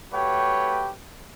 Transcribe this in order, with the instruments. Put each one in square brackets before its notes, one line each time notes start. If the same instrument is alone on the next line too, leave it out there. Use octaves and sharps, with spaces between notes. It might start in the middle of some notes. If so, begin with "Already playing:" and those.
[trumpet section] A3 F#4 G4 B4 C#5 G5